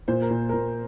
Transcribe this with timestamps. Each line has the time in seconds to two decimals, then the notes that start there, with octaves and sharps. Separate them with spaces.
0.08 A#2 C5
0.22 A#4
0.30 A#2
0.49 A#2 A#4